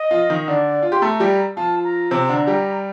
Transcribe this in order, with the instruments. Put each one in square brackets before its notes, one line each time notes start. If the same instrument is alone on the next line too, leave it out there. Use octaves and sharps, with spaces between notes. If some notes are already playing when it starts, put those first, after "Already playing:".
Already playing: [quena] D#5
[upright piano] F3 F4
D#3 D#4
[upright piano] D3 D4 [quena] D5
[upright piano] F4
[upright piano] G4 [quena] C6
[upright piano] A3 A4 [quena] A#5
[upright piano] G3 G4
[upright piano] F3 F4 [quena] A5
[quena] A#5
[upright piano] C3 C4
D3 D4
G3 G4